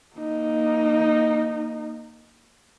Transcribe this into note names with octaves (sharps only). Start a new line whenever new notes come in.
A#3 D#4